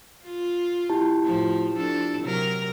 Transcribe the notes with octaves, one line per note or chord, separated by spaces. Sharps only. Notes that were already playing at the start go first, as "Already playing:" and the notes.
F4
E4 G4 A5
A2 F3
F3 D4 A4
C3 F#3 A#4